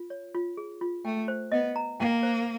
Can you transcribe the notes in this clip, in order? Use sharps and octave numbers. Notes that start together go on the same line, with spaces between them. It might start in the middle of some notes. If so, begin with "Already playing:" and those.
Already playing: F4
C#5
F4
G#4
F4
A3 G5
C5
B3 D#5
A#5
A#3 G5
C5